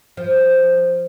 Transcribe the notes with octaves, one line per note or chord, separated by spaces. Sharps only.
F3